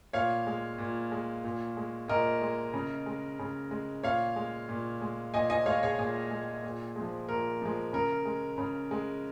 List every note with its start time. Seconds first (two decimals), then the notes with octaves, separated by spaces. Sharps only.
0.13 A#2 C#5 F5
0.47 G#3
0.78 A#2
1.12 G#3
1.44 A#2
1.77 G#3
2.08 A#2 A#4 D#5
2.41 G#3
2.74 C#3
3.06 G#3
3.39 C#3
3.71 G#3
4.03 A#2 C#5 F5
4.36 G#3
4.69 A#2
5.01 G#3
5.34 A#2 D#5 G#5
5.50 D#5 G#5
5.65 G#3 C#5 F5
5.83 G#4 C#5
5.98 A#2 G#4
6.31 G#3
6.63 A#2
6.96 F3 G#3
7.29 A#2 A#4
7.62 F3 G#3
7.93 C#3 A#4
8.25 G#3
8.58 C#3
8.91 G#3